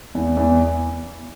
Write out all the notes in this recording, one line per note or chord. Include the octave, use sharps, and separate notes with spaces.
E2
E2